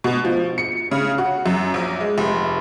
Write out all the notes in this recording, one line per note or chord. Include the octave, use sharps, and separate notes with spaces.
B2
F3
C#7
C#3
F#4
F#2
A#1
G#3
F1